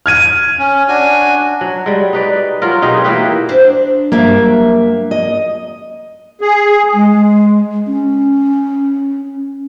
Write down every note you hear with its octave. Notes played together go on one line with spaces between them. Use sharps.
F6 G#6 D#7
C#4
D4 F#4 G#5
F#3
G3 G#3
D#4 B4 D5
F#3 F4 A#4
B2 D#4 G4 G#4
E3 A#3 G4 B4
D4 C5
G2 F#3 A#3 E5
D#5
G#4
G#3
C#4